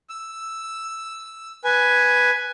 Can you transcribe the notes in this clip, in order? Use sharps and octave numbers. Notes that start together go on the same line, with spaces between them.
E6
B4 G#5